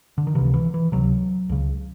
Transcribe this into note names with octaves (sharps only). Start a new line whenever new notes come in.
D3
D#3
C#2 C3 E3
E3
E3
C#2 C3 F#3
C#2 C#3